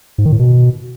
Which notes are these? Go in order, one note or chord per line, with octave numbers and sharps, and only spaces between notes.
G#2
D#3
A2
B2